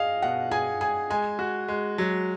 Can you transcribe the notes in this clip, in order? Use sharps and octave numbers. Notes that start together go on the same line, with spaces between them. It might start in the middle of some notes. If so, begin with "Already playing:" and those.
Already playing: G#4 D#5 F5
B2 F#5
G#4 G#5
G#4 G#5
G#3 G#5
F#4
G#3
F#3